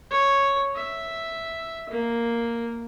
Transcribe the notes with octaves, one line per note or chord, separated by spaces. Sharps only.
C#5
E5
A#3